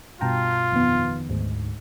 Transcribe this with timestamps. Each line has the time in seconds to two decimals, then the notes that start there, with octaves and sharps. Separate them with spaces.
0.21 G2 B2 F4 G5 A5 A#5
0.72 F2 D#3 B3
1.29 D2 G#2